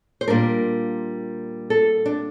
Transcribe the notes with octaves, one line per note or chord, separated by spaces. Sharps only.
C5
A#2 G3 A#3 D4 A#4
A4
D4